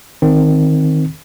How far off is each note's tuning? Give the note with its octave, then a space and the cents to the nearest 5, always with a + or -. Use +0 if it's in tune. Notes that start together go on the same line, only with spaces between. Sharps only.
D#3 +0 C4 +0